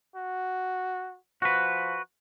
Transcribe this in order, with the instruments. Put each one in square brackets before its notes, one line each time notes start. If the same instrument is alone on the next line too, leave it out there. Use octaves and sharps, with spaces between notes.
[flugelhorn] F#4
[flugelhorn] F3 [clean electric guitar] F#4 B4